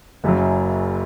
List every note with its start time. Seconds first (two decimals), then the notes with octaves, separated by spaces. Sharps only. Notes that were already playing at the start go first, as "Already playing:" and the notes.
0.24 F#1 F#2 C#3 F#3